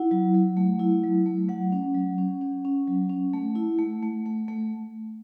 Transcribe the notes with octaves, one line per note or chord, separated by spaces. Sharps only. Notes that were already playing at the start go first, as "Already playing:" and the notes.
Already playing: E4 F#5
F#3
F#3
A3
E4
F#3
A3
F#3 F#5
C#4
F#3
C#4
C#4
C#4
F#3
C#4
A3
E4
A3
A3
A3
A3